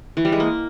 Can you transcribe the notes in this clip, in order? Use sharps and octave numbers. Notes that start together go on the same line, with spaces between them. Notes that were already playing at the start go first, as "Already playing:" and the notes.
E3
G3
G#3
A#3